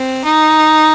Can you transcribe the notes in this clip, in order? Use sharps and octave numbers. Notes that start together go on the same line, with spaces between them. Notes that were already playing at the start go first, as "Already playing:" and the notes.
Already playing: C4
D#4